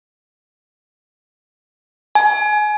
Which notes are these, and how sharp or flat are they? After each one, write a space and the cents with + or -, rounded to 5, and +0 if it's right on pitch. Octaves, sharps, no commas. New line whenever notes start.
G#5 +25